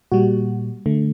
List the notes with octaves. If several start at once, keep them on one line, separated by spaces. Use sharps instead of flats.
A#2 G3 F#4
D3 A3